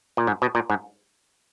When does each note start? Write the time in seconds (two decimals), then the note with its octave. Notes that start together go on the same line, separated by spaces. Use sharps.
0.17 A#2
0.27 G#2
0.42 B2
0.55 A#2
0.70 G#2